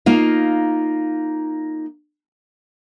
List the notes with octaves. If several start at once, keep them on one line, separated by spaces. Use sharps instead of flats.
A#3 D#4 F4 F5